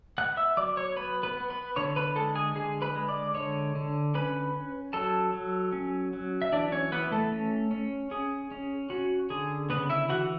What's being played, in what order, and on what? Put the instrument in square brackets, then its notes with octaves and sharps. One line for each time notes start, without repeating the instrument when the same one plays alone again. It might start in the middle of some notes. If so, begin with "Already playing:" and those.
[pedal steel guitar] B3 F#5 F#6
E5 E6
F#3 D5 D6
C#5 C#6
B3 B4 B5
B4 B5
B3
B4 B5
D3 C#5 C#6
B4 B5
G#3 A4 A5
G#4 G#5
D3 G#4 G#5
B4 B5
G#3
D5 D6
D3 C#5 C#6
D3
C#4 B4 B5
C#4
F#3 A4 A5
F#3
C#4
F#3
E5
E3 D4 D5
C#4 C#5
E3 B3 B4
A3 A4
C#4
C#4
C#4 G#4
C#4
C#4 F#4
D3 G#4
C#3 B3 B4
E4 E5
E3 F#4 F#5